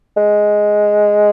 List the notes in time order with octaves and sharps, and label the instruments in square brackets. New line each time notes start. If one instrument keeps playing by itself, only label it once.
[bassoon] G#3